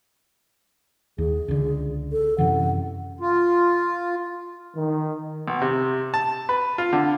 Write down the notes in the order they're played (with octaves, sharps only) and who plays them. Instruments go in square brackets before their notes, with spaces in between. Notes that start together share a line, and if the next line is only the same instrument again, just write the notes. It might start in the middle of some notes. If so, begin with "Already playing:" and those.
[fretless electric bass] D#2 [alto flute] G#4
[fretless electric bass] C#2 D3
[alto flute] A4
[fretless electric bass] F#2 C3 E3 [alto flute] F#5
[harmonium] F4
[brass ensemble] D#3
[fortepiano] B1
C3
A5
B4
F4
D3